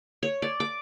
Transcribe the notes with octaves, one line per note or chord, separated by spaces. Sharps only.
C#5
D5
D6